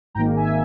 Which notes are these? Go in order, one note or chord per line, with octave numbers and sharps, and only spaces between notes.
G#1 G#2 D#3 A#3 G5 A#5
E5 G#5